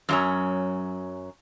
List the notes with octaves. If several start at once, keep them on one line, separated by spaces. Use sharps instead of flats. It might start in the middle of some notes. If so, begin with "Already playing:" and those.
F#2 F#3 C#4